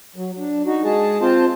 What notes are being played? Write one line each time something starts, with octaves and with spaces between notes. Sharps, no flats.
F#3
D4
D#4 F#4
G#3 G#4 A5
C4 F4 C5 A5